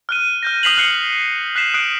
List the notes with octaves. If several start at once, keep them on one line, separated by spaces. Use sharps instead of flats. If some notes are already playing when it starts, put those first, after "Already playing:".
F6 F#6 D#7
F6 G6 A#6
D#6 F6 B6 C7 F7 F#7
F6 F#6 C7 C#7
F#6 B6 C7 E7
D#6 F#6 C7 D7